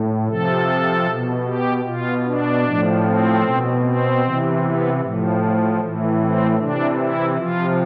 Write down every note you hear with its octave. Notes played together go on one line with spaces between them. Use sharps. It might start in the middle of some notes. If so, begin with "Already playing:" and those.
Already playing: A2
C3 F3 A4
B2
G4
B2 F4
D4
A2 F3
C4
B2
C4
C3 E3
B3
A2 F3
A2 E3
C4
C3 E3 D4
E4
C3 F3 F4